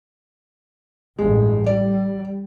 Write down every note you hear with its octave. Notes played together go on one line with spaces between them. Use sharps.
A1 G2 G#3
G3 D5